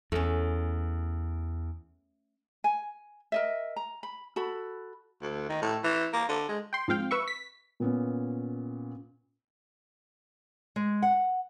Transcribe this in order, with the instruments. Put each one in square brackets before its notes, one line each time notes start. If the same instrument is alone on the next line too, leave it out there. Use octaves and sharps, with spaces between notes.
[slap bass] E2 [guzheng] A3 C#4
[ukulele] G#5
A#4 D#5 E5
A#5
B5
F#4 A4 B5
[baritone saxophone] D2
D#3
A2
E3
A#3
D3
G#3
[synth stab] G5 C6
G#2 F3 C4 F5 G5
B4 E5 C#6
B6
[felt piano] A#2 B3 C#4
[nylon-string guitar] G#3
F#5